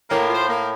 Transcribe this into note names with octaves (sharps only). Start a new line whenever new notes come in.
A2 A#3
F4 C5
A#3